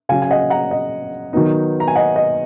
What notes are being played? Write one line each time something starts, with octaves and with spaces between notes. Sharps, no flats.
C#3 F#3 C#4 F5 G#5
G#5
D#5 F#5
F#5 A#5
D#5
D#3 F#3 B3 D#4
A#5
G#5
D#5 F#5
D#5